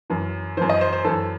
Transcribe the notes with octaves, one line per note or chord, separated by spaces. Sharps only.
F#2 E3
F#2 E3 C5
D#5
C5
C5
F#2 E3 A4